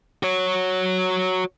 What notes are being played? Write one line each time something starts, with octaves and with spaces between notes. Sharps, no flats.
F#4 C#5